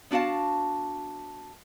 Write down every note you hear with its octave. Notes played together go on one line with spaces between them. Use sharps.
B3 D4 F#4 F5 A5